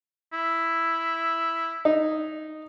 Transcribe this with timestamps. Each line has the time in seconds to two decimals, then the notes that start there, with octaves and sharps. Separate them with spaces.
0.33 E4
1.85 D#4